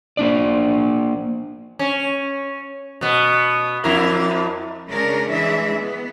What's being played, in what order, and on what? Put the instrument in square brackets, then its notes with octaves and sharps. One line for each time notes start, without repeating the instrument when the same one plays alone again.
[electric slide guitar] A#3 D4 D5
[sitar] C#4
B2 B3
F2 E4 A#4
[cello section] C#3 G#3 C#4 D4 A#4
E3 G#3 D4 E5
B3